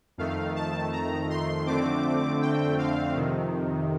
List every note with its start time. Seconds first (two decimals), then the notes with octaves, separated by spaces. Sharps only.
0.18 F2 D#3 A3 F5
0.56 A5
0.92 A#5
1.30 C6
1.67 F2 D3 A3 C4 D6
2.42 G5
2.79 F5
3.16 F2 C3 D#3